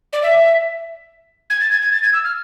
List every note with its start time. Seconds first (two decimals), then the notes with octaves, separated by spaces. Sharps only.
0.13 D5
0.23 E5
1.50 G#6
1.61 A6
1.71 G#6
1.82 G#6
1.92 A6
2.03 G#6
2.13 E6
2.24 F6